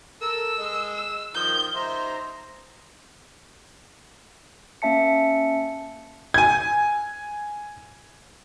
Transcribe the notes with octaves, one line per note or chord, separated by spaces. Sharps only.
A4 A#4 E6
G#3 D#5
E6
D#3 F3 G6
D#4 C5 E5 A#5
A#3 C#4 E5 A5 C#7
G#5 G#6